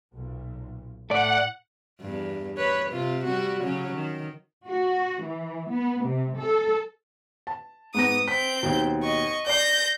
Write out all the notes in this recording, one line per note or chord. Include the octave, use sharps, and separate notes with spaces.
B1 A#2
A2 A3 D5 F#5
E2 G2
B4 C#5
C3 F4
G3 F#4
C#3 F#3 C#4
D#3
F#4
E3
B3
C3
A4
A5
G#2 B3 D#6 A#6
C4 G6 B6
D#2 B2
D#5 C#6
D5 G6 A#6 C7